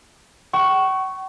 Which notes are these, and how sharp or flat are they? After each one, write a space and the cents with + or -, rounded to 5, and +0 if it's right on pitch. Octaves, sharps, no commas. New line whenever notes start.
F#5 +45 C#6 +0